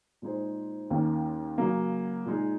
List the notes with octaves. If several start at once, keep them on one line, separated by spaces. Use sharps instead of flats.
A#2 G#3 D#4 G#4 C5
D#2 D#3 A#3 C#4
C#3 F#3 A#3
A#2 G#3 D#4 G#4